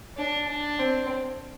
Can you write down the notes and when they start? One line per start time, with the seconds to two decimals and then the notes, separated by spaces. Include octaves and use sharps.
0.17 D4
0.48 D4
0.79 C4